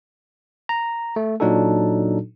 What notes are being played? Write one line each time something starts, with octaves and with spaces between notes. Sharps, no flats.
A#5
A3
A#2 F#3 D4 D#4 F#4 A4